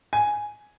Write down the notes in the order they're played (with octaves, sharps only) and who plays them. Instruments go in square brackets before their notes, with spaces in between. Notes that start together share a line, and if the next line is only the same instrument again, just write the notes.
[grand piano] G#5